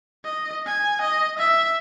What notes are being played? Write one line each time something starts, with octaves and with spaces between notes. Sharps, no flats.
D#5
G#5
D#5
E5